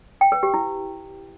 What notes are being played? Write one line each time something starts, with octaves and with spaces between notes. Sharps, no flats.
G5
B4
G4
E4